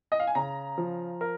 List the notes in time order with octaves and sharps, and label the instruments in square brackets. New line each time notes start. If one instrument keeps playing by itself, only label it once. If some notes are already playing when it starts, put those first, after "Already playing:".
[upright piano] D#5
F5
G#5
[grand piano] C#3 [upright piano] A#5
[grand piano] F3
A#4